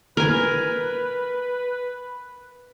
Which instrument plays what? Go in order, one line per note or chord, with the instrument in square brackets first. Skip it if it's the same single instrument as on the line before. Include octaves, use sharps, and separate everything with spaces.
[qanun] A#4 G#5 [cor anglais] B4